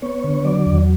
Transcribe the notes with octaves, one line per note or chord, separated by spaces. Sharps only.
B3 C#5
D3
F#3 D5
E2